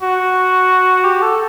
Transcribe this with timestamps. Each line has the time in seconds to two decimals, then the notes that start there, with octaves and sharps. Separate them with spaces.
0.02 F#4
1.05 G4
1.22 A4